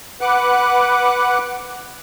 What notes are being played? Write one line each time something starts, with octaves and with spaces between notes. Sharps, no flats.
B4 F#5 D6 F#6